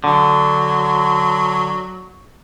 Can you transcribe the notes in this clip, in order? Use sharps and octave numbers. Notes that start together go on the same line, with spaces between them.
D3 F#3